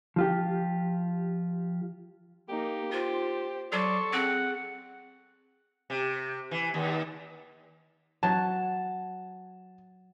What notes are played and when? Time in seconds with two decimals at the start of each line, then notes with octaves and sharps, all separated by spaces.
0.16 F3 F4 G4
2.49 A#3 D#4 G4
2.92 F4 C5
3.72 F#3 A4 D5 C6 C#6
4.13 C4 G#4 F#5
5.90 C3
6.51 E3
6.74 D#2
8.23 F#3 A5